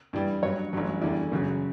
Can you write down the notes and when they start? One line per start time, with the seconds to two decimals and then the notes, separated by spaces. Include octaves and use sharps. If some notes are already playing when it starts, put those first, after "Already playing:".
0.13 G2 E3 G3
0.43 G2 F#3 C#5
0.73 A1 G2 F#3
1.02 E2 D3 G3 E4
1.32 F#2 C#3 F#3